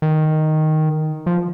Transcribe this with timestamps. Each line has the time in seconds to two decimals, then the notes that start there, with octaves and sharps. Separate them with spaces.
0.02 D#3
1.26 F3